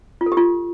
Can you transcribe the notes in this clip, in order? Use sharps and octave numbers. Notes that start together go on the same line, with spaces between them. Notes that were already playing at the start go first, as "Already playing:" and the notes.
F4
A4
G4
F4